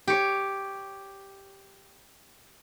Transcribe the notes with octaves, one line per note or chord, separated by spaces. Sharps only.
G4 C#5